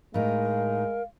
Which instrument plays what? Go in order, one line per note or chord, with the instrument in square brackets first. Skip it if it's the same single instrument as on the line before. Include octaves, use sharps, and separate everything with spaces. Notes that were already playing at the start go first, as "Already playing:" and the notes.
[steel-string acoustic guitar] A2 D#4 [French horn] G#3 [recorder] A#4 [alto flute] F5